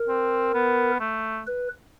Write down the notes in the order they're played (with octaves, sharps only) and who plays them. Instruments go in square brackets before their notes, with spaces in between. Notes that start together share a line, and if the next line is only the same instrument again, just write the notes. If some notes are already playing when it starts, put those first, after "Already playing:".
Already playing: [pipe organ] A#4
[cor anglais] C4
B3
A3
[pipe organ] B4